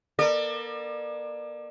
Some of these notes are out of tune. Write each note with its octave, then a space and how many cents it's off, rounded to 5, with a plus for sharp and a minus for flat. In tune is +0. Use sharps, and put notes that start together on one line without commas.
A#3 +40 A#4 -45 D5 +35